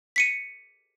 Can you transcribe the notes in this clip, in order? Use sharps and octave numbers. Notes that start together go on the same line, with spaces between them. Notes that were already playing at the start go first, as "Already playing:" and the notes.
B6 C#7 D#7